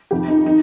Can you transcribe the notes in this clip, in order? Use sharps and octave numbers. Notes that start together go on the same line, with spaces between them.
F2 C3 D#3 G4
D#4
D#3 D#4